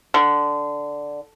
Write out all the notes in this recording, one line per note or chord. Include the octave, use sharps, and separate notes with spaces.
D3